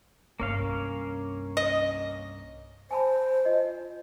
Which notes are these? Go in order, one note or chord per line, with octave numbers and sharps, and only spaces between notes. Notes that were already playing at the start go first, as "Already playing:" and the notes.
C2 G2 A#3 C#4 F5
D#5
C5 G#5 A5 B5
F4 D#5